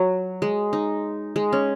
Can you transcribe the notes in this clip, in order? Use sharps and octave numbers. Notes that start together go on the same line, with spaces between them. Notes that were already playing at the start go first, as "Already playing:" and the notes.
Already playing: F#3
G#3
D#4
G#3
C#4